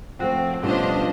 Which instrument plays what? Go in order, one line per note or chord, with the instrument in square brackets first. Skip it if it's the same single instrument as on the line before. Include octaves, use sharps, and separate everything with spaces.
[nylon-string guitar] F3 A3 C5 [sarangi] C4 [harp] F#4
[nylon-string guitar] B2 G3 A3 [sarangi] F3 [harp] C#4 [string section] D4 C5 D#5